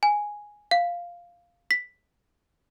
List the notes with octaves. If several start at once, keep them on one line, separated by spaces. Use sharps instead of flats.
G#5
F5
B6